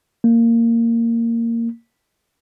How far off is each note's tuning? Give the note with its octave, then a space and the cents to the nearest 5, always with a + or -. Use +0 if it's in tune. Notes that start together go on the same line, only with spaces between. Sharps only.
A#3 -15